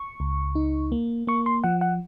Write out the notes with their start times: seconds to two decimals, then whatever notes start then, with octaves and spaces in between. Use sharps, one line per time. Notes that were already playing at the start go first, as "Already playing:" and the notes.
Already playing: C#6
0.20 C#2
0.55 D#4
0.92 A#3
1.27 A#3 C#6
1.46 C6
1.64 F3 F#5
1.81 F#5